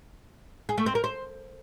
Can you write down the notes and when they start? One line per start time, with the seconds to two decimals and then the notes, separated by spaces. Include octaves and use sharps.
0.69 G#4
0.78 A3
0.86 C4
0.95 A#4
1.04 C5